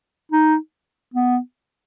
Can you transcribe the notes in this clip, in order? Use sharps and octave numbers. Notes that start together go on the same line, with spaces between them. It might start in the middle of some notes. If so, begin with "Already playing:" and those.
D#4
B3